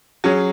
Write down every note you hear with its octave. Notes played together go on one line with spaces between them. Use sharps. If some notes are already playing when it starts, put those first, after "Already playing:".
F#3 C#4 G#4